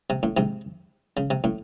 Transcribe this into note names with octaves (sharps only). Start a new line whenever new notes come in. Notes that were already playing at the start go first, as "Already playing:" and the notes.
C3
A2
G#2 C3
C#3
C3
A2